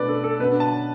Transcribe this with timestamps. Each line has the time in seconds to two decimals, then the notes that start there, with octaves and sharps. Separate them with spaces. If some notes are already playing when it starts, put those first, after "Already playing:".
Already playing: B2 A3 D4 B4 D5
0.09 A4
0.24 A4
0.39 B2 B3 D4 B4
0.60 A5